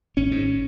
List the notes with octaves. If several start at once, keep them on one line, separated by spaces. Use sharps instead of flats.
G#1 C#4
G#2